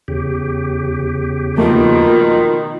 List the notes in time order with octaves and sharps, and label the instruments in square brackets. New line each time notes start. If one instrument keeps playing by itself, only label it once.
[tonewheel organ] E2 C#3 G4
[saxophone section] B2 D#3 [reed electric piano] F3 A3 A#3 [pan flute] F4